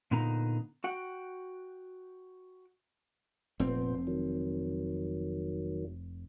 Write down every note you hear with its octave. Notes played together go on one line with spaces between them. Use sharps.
A#2 D3 B3 D#4 A#5
F#4 F#5 G5
F1 A#2 B3 C4 C5
D#3 F#3